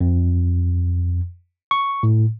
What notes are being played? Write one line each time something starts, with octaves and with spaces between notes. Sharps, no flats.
F2
C#6
A2